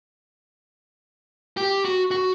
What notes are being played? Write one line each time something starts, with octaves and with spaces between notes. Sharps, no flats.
G4
F#4
F#4